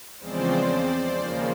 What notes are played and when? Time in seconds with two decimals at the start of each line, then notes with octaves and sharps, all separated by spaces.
0.19 E2 C#3 F3 G#3 C4 C5 D5
1.19 D#2 C#3 F3 A#3